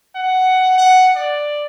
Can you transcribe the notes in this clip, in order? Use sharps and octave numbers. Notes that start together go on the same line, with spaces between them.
F#5
F#5
D5